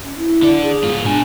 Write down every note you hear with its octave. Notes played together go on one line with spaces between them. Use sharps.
C#4
E4
D3 D5
G#4
G#2 F4
B2 D4 G#5